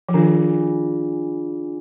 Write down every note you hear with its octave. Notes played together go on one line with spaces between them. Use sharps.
F3
D#3 D4 F4 G#4